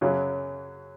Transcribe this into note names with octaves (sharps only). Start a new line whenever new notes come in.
F#2 C#3 F#3